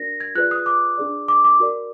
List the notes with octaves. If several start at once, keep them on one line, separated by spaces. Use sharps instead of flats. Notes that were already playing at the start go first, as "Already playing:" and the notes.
Already playing: D4 F#4 A#4 D5 A#6
G#6
F4 G#4 B4 D5 F#6
D#6
D6
D4 G#4 D5
D6
D6
F#4 A#4 D5